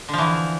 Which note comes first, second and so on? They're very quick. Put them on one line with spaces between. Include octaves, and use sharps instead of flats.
D3 F3 E3